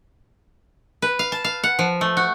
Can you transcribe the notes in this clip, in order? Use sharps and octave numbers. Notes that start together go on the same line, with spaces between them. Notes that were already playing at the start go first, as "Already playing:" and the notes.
B4
F5
A5
F5
F#5
F3
A3
F#4